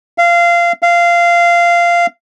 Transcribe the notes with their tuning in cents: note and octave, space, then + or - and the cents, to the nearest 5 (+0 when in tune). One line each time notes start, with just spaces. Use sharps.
F5 -20
F5 -15